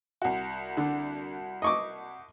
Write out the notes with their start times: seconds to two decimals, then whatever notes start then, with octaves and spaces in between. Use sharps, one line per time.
0.22 C2 F#4
0.77 D3
1.62 D#5 C#6 D6